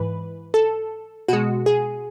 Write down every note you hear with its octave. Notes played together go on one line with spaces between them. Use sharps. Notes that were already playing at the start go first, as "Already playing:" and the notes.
Already playing: G#2 E3 B4
A4
B2 G#3 F#4
G#4